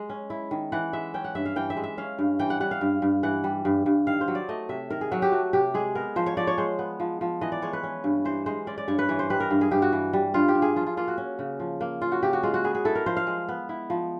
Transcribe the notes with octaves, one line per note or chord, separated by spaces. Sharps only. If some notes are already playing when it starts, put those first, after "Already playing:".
Already playing: G#3
C#4
E4
D#3
E3 F#5
G#3 E5
C#4 G5
F#5
G2 E5
F5
E3 G5
E5
G#3
E5
C#4 F5
G2
E3 G5
F#5
G3 F#5
F5
G2
G2
E3 F#5
G3
G2
G2
D#3 F5
C5
F#3
D5
A3 D#5
C3 E5
D#3 A#4
G#4
F#3 F#4
G4
A3 F#4
C3 G4
G#3 G#4
B3 A#4
F3 C5
C#5
F3 D5
C#5
G#3 C5
B3
F3
F3
E3 D#5
D5
G#3 C#5
B4
C#4
G2
E3 C5
G#3 C5
C#4 D5
D5
G2 C#5
B4
E3 C#5
C5
G3 B4
A#4
G2
G#4
G2 G4
F#4
E3
G3
G2 F4
G4
G2
G#4
F3 F4
F4
A#3 F4
F#4
C#4
C#3
F3
A#3
C#4 F4
F#4
C#3 G4
F#4
G#3 F4
F#4
B3 G#4
G#4
E4 A4
A#4
F3 C5
F5
G#3
B3
E4
F3